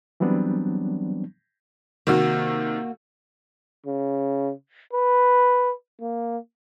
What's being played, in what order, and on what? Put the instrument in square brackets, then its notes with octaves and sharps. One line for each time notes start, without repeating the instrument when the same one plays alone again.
[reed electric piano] E3 F#3 G3 B3 C4 D4
[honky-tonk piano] C3 D#3 [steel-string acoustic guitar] A#3 F#4
[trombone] C#3
B4
A#3